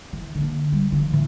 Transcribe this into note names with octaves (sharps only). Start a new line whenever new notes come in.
E3
D3 A#3
G3
D3 F3
A#2 E3